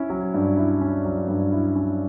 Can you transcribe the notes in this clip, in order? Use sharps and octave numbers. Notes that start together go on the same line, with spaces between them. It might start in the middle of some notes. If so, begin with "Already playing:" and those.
Already playing: C#4 E4
F#3
G2
E4
C#4
F#3
G2
E4
C#4